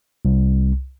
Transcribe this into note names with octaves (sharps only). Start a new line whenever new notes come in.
C2